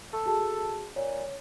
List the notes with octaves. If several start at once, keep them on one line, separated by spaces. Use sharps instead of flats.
A4
F#4 G#4 A5
A#2 C#5